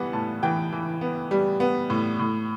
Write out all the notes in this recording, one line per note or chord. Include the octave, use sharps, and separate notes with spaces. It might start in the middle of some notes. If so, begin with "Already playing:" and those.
Already playing: E3 G3 B3 F#5
A2 A5
E3 G5
E3
B3
G3
B3
A2
A2